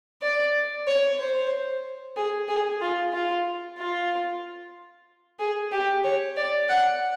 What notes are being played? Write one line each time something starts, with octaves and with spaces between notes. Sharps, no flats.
D5
C#5
C5
G#4
G#4
F4
F4
F4
G#4
G4
C#5
D5
F#5